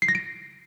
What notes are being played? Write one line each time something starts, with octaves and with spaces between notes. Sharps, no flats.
C7
A#6
D7